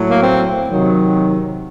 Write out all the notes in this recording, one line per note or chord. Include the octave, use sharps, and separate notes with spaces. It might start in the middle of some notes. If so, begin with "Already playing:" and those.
Already playing: A2 F#3
A#3
C4
C3 D#3 F#3